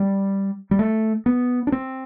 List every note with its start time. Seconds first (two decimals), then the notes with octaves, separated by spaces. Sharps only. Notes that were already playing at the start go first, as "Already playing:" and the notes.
Already playing: G3
0.71 G3
0.79 A3
1.26 B3
1.67 D4
1.72 C4